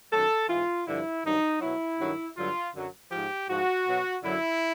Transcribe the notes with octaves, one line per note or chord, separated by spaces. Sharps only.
F#2 D#3 F#3 A4
G#2 E3 F4
G2 D3 F3 E4
G2 D#3 F#3 D#4
B2 F#3 E4
G2 D#3 F#3
G2 D3 F#3 F4
F#2 D3 F#3
G#2 F3 G4
G#2 F3 F#4
B2 F#3
F#2 D3 F#3 E4